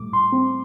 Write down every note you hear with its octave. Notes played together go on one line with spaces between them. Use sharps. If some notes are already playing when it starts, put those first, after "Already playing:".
Already playing: A2 G3 A3 D6
A2 C6
C4